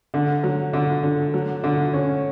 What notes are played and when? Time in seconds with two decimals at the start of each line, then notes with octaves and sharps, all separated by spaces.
0.14 D3
0.43 F#3
0.73 D3
1.03 D3
1.34 F#3
1.64 D3
1.94 C#4